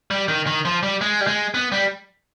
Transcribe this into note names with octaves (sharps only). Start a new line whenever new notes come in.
G3
D#3
D#3
F3
G3
G#3
G3
G#3
B3
G3